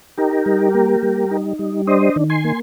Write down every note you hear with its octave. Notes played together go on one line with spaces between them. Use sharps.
D#4 G4 A#4
G3
A#3
G3
D#4
G3
D4 C5 D#5
D#3
G#5 C6
A#3